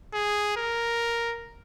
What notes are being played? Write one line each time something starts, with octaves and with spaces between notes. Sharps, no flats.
G#4
A#4